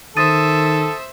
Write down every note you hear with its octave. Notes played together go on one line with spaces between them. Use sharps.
D#3 A4 C5 E5 D#6 A6 D#7